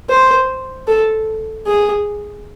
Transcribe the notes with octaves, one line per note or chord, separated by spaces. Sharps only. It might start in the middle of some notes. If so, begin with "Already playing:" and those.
C5
A4
G#4